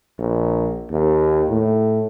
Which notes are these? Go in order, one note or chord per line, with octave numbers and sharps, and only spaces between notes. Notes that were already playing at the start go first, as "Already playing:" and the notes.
A#1
D#2
A2